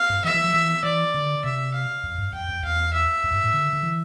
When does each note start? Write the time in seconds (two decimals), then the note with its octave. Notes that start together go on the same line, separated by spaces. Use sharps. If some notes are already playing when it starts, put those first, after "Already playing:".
Already playing: F5
0.10 G2
0.24 E3 E5
0.34 E3
0.44 F3
0.54 E3
0.83 E3 D5
1.14 D3
1.44 C3 E5
1.74 F5
2.04 F2
2.18 G2
2.33 F2 G5
2.48 F2
2.63 E2 F5
2.93 E5
3.24 F2
3.33 G2
3.44 A2
3.54 D3
3.73 D3
3.83 E3